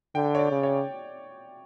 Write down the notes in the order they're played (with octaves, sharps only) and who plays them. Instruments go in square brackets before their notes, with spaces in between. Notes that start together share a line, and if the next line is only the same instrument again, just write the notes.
[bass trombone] D3 [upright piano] G5
[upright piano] C#5
D5
[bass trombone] C#3
[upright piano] C#5